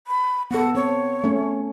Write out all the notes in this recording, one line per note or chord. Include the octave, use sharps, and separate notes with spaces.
B5
B3 A4 F#5
C4 C#5
A3 C#4